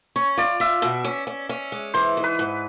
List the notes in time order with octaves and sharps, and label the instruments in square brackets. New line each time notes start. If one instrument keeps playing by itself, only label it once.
[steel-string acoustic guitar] C#4 [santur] C#5
[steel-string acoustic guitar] F4 [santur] D5
[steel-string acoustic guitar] F4 [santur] E5
[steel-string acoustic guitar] B2 [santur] E5
[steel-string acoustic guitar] C#4
C#4
C#4
G#3
[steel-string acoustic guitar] E3 [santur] C5
[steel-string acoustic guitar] G#2
[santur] B4
[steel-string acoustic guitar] G#2